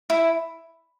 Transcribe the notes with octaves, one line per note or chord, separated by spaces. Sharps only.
E4